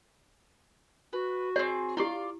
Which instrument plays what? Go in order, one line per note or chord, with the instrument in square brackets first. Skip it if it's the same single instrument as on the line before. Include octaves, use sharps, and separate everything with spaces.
[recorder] F#4 [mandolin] B4
[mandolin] C4 G#4 [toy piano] C#5
[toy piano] E4 G4 [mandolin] F4 D5